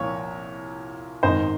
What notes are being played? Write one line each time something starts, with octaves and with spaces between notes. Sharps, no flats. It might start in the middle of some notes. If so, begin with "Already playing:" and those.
Already playing: C2 A#2 F3 C#5
G#1 G#2 D#3 C5 D#5